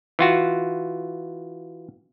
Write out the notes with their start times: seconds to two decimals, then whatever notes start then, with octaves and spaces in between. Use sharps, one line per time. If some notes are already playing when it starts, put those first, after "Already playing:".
0.19 E3 F4 F#4